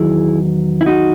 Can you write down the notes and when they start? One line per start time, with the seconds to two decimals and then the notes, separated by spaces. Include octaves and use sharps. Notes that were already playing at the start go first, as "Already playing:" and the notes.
Already playing: E2 D#3 F#3 E4 G#4
0.81 E4
0.86 D#4 F#4